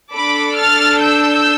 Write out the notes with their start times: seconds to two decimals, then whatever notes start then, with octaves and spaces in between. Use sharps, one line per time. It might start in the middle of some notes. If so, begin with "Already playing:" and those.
0.14 D4 A4 B5 D6
0.58 F6 A6
1.02 E6 G6